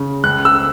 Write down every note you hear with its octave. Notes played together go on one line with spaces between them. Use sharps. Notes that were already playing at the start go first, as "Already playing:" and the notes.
Already playing: C#3
C#2 F#6
E6